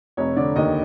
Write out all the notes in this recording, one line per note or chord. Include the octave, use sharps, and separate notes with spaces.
F1 C#5
D3 D5
D#2 D#5